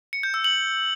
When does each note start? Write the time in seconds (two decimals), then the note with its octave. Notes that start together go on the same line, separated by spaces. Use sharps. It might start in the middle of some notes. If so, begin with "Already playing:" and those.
0.13 C#7
0.23 G6
0.34 E6
0.44 F#7